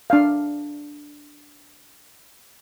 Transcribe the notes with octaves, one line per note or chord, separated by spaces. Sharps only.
D4 F5